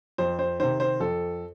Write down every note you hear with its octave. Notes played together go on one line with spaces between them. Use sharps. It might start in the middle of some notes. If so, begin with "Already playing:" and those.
F2 C5
C5
C3 D#3 C5
C5
F2 A4